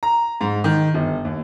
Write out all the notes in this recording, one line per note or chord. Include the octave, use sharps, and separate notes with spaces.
A#5
G#2
D#3
G1
D#2